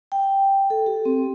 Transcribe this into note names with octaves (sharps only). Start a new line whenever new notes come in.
G5
A4
G4
C4